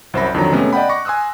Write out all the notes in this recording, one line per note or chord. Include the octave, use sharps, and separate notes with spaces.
C2 F#2 C5 E5 B5 A#6
F2 D3 D#3 F#3 A#5
C3 G#3 A3 B3 C#4
D5 D#5 F#5 G5 B5
F#5 C#6 D6 A#6
G#5 C6 D#6 E6 F#6